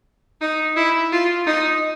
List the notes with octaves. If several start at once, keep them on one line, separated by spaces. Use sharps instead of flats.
D#4
E4
F4
D#4